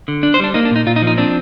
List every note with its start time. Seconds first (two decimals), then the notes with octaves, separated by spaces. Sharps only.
0.08 D3
0.23 D4
0.34 C5
0.40 G3 D4
0.54 A#3 D#4
0.65 D4
0.71 A#2 D#4
0.87 A#2 F4
0.96 D#4
1.02 F3
1.07 D#4
1.17 C4 D4